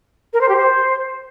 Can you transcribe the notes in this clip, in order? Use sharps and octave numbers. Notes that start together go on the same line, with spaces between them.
A#4
C5
G4
C5